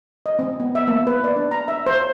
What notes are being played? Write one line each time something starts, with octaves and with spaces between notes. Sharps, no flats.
D#5
C4
B3
E5
A#3
B4
D5
D4
A#5
E5
C5
C#5